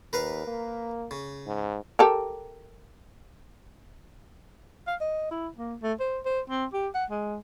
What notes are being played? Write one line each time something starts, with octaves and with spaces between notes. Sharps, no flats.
D#2 A#4 B4 F5
A#3
C#3
G#2
G4 A4 A#4
F5
D#5
E4
A#3
A3
C5
C5
C4
G4
F#5
G#3